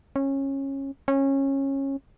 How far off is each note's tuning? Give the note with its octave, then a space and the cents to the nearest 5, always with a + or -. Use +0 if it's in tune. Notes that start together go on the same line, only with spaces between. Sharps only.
C#4 -20
C#4 -20